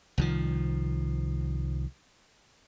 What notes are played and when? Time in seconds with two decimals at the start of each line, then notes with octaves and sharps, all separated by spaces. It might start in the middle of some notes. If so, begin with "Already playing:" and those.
0.18 C2 D#3 F3